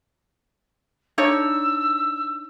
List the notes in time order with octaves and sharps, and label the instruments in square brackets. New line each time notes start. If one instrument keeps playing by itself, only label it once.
[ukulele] D4 D#4 C#5 [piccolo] E6